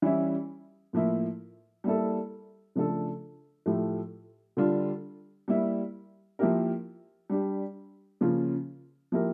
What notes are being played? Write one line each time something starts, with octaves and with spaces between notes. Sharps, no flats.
E3 G3 C#4 E4
A2 F3 A#3 E4
G3 A#3 E4 A4
C#3 F3 A3 D4 A4
A2 F3 A3 E4 G4
D3 G3 D4 F4
G3 A#3 E4
F3 A#3 E4 G4 A#4
G3 D4 G4
C#3 F3 A#3 C#4 F4
F3 A#3 E4 G4 A#4